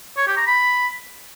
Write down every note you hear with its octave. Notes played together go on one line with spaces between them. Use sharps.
C#5
G4
A#5
B5